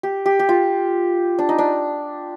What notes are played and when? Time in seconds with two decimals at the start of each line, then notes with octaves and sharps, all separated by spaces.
0.03 G4
0.26 G4
0.39 G4
0.49 F4
1.39 D4
1.49 D#4
1.58 D4